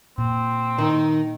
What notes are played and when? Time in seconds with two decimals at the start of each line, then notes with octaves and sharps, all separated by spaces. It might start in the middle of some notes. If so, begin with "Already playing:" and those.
0.18 A#2 C4
0.78 D#3 D#4